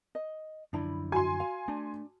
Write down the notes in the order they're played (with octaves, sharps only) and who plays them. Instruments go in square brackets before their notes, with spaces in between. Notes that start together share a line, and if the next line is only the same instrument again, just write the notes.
[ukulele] D#5
[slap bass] F#2 D3 F3 [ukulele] D4 E4 B5
[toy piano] F#4 [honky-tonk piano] G#5 C6
[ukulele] F5
[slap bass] A3 [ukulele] D4